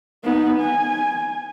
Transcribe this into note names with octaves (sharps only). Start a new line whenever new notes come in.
B3 D#4
G#5